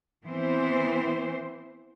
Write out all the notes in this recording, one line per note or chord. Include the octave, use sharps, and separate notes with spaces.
E3 B3 C4 C5